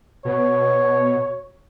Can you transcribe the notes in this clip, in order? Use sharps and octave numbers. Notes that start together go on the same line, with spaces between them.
B2 C#5